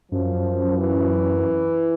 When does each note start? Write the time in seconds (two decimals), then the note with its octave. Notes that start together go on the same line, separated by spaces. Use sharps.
0.11 F#2 F3
0.78 E3